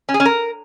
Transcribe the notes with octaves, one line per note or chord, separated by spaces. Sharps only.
C#4
G#4
C#4
A#4